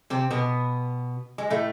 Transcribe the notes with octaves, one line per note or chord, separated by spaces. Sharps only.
C3 C4
B2 B3
G#3
A2 A3